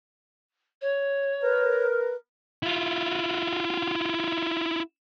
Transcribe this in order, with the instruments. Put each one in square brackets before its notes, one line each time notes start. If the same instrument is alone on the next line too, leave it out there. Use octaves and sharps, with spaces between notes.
[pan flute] C#5
[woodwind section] A#4 [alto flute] B4
[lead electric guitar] E4 F4